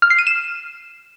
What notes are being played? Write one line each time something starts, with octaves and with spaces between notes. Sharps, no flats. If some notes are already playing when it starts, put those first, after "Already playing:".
F6
C7
D#7
E7